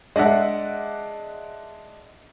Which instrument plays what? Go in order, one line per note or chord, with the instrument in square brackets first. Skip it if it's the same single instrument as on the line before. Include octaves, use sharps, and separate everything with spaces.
[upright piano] G#3 D4 D5 E5 F#5